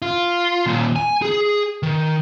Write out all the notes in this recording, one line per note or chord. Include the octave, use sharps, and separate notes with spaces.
F4
D#2 A#2
G#5
G#4
D#3